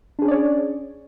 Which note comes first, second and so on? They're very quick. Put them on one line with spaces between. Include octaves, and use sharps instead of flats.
D4 G#4 C#4 D5 C#5